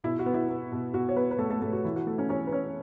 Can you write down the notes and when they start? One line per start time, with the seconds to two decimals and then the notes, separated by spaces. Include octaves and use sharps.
0.04 B2 E4
0.19 F#4
0.26 B3
0.34 E4
0.49 B3
0.72 B2
0.93 B2 F#4
1.09 C#5
1.16 B3 B4
1.31 B4
1.39 A3 B3 A4
1.50 A3 A4
1.62 B2 A3 A4
1.73 F#4
1.84 E3 E4
1.96 F#4
2.07 A3 A4
2.18 C#4 C#5
2.29 E3 C#4 C#5
2.47 B4
2.52 C#4 C#5